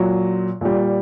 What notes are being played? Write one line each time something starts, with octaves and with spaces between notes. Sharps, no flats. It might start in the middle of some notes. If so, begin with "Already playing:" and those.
Already playing: A#2 F#3
A#2 G3